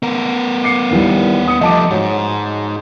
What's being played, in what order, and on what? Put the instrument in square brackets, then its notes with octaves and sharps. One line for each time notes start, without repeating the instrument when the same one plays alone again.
[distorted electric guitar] B3 A#4
[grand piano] D6 C7 C#7
D#2 E3 G3
D#6 C#7
[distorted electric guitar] F3 A3 [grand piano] D#5 A5 D6
[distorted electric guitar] G#2 [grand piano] F#4 C#5